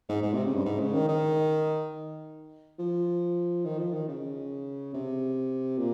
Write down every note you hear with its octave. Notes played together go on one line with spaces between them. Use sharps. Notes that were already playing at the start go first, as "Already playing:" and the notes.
G#2
G#2
C3
C#3
G2
G#2
C#3
D#3
D#3
F3
D#3
F3
D#3
C#3
C3
A#2